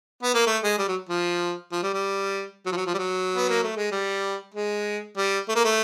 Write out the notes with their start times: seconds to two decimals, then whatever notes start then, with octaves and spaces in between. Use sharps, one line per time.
0.23 B3
0.34 A#3
0.47 A3
0.63 G#3
0.78 G3
0.88 F#3
1.09 F3
1.72 F3
1.83 G3
1.94 G3
2.66 F#3
2.72 F3
2.77 F#3
2.86 F3
2.94 G3
2.98 F#3
3.36 B3
3.50 A#3
3.64 A3
3.77 G#3
3.92 G3
4.54 G#3
5.17 G3
5.48 A3
5.55 A#3
5.64 A3